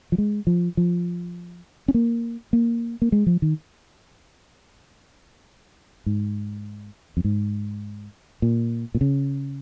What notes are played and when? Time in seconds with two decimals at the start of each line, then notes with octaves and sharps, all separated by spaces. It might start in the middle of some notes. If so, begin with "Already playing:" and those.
0.12 F3
0.18 G#3
0.47 F3
0.77 F3
1.88 C#4
1.94 A#3
2.53 A#3
3.02 A#3
3.12 G#3
3.27 F3
3.42 D#3
6.06 G#2
7.17 F2
7.24 G#2
8.42 A#2
8.95 A#2
9.01 C#3